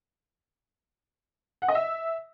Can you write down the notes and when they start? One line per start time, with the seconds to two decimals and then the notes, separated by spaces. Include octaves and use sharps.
1.62 F#5
1.68 D#5
1.75 E5